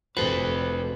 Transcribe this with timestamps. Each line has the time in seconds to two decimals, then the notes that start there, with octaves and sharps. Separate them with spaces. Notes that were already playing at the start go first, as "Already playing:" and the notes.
0.17 F1 F#4 A4 B4 C5